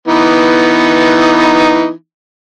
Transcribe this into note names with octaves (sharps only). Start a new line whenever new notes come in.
E3 B3 D#4